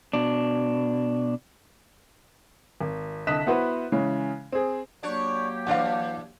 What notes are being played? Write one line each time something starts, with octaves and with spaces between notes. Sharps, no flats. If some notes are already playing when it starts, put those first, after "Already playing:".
B2 D4
G#1
C2 D3 D#5 F#6 B6 E7
B3 E4 F#4 B4 C5 F#5
C#3 E3 G#3 C#4
C4 G#4
F#3 A#3 D4 G4 C#5
E3 D4 F5 F#5